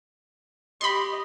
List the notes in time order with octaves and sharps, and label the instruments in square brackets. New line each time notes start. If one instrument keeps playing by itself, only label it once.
[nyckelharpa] G4 D#5 [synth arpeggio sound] B5 C6